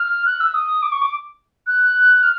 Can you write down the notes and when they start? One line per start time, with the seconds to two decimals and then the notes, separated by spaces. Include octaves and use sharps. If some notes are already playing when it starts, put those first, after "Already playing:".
Already playing: F6
0.26 F#6
0.40 E6
0.54 D#6
0.82 D6
0.92 C#6
1.02 D6
1.67 F#6
2.23 F6